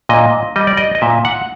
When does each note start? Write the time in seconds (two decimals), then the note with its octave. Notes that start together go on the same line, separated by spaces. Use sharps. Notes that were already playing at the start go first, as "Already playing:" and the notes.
0.09 A#2 D#5
0.56 G3 D#5
0.67 D5
0.77 D#5
0.95 D#5
1.02 A#2 E5
1.25 F#5